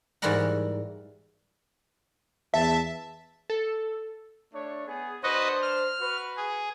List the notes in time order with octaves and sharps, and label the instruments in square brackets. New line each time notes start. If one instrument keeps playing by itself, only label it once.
[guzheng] G#2 E3 G3 F#4 A#4 F#5
[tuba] E2 [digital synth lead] E5 [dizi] A5
[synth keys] A4
[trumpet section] A3 D4 C#5
B3 G#4
[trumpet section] D4 C5 [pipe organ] F#4 B4 D#5
[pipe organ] F6
[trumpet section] F#4 B4
[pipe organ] G#4